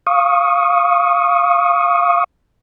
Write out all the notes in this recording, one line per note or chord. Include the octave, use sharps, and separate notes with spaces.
F5 C#6 D#6